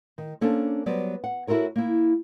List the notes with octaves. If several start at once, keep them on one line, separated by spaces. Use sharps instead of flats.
D#3
A#3 C#4 D4 A4 C5
F#3 G3 B3 C5 D5
F#5
E4 F#4 A4 A#4 C#5
A#3 E4